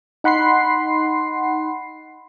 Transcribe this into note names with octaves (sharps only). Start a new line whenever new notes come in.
D#4 F#5 B5 C6 C7